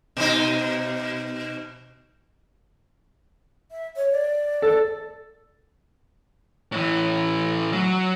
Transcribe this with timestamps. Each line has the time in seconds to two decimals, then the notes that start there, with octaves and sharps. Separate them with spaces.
0.17 B2 D#4
3.71 E5
3.97 C#5
4.12 D5
4.62 A4
6.72 A2 E3
7.73 F#3